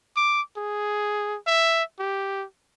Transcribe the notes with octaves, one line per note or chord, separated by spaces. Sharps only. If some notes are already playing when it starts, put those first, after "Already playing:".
D6
G#4
E5
G4